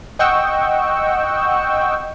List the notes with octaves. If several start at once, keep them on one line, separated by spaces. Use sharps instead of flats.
D#5 F#5 G5 C#6 E6